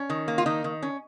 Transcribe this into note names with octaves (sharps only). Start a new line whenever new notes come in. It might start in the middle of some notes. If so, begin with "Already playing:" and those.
Already playing: C#4
D#3
A#3
F4
D#3 D#4
D#3
C#4